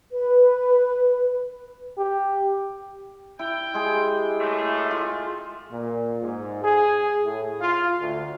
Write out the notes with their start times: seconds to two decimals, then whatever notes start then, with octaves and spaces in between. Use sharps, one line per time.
0.11 B4
1.98 G4
3.39 E4 G5
3.74 G#3 G4 G#4
4.40 F#2 A2 A3
4.91 F4
5.72 A#2
6.22 G#2
6.63 G#4
7.24 A2
7.61 F4
8.00 D2